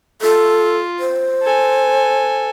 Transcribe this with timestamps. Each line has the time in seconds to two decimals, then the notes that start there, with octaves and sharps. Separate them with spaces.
0.22 F4 A4
1.00 C5
1.43 A4 G#5